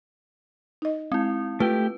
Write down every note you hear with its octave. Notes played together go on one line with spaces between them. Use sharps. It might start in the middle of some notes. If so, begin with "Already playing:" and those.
D#4 D#5
G#3 C4 E4
A3 F4 G4 B4 G5